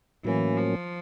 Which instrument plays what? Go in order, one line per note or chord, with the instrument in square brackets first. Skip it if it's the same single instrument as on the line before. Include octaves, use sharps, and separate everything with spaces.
[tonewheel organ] A2 F#3 A#3 C#4 [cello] E3
[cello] F3